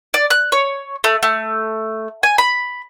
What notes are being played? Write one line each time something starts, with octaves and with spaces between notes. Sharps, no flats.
D5
F#6
C#5
A3
A3
G#5
B5